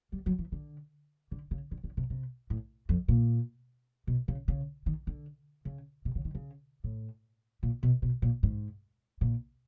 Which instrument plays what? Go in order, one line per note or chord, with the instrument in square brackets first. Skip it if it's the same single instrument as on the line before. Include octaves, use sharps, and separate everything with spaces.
[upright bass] G3
F#3
E3
D3
D3
C#3
D3
D3
C3
C3
A2
F2
A#2
B2
C#3
C#3
D#3
D3
C#3
C3
C#3
D#3
C#3
A2
A#2
B2
B2
A#2
G#2
A#2